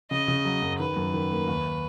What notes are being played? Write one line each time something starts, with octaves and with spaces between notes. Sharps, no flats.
C#3 D#5
C#3
F#3
F#2
D#3 B4
F#2
D#3
A#3
D#2